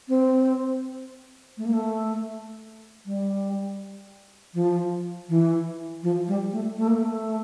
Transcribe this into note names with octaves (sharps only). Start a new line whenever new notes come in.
C4
A3
A#3
A3
G3
F3
E3
F3
G3
A3
A3
A#3
A3